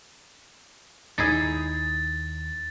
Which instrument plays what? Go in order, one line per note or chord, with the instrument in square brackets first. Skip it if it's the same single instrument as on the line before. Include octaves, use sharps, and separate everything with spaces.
[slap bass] D#2 [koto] D#4 E4 G#4 [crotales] A6